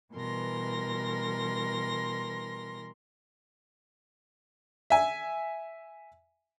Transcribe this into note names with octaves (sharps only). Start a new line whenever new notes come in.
B2 E3 G3 A#4 C6 A#6
E5 G#5